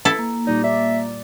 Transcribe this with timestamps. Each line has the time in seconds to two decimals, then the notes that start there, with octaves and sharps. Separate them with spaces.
0.05 E4 A4 A5
0.19 A#3
0.47 A#2 G3 D#4 D5
0.64 D5 E5